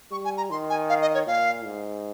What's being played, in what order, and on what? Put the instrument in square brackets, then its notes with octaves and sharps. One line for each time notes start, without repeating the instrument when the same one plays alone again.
[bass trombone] G3 [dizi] C#6
[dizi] G#5
A#5
[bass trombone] D#3 [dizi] C6
[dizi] G#5
F5
D#5
C#5
[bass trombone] A#2 [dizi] F5
[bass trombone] G#2